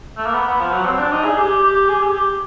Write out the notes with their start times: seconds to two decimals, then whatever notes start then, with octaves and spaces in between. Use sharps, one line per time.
0.17 A3
0.26 A#3
0.34 B3
0.47 B3
0.60 F3
0.73 F#3
0.86 C4
0.99 D4
1.12 D#4
1.25 G#4
1.37 G4
1.64 G4
1.89 G#4
2.03 G4
2.15 G4